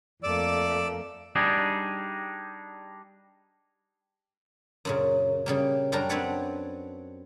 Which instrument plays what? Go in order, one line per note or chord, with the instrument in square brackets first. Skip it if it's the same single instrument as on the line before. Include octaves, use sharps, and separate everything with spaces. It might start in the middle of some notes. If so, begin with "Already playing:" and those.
[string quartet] F2 A3 A#3 [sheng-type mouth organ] D5 D6 E6
[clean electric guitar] G3 D4 D#4 G#4
[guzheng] F#2 A#2 C#3
C#3 G3 A#3
F#2 G3 D4 G4 A#4 A#5
C4 D4 B4 C#5 D5 F#5